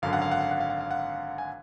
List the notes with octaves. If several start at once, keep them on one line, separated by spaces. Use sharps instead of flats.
G#1 F#2 D3 F5
F#5
F5
F#5
F5
F#5
F5
F#5
F5
F#5
F5
G#5